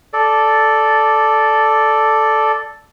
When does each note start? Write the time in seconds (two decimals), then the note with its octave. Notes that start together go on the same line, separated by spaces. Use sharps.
0.13 A4 D5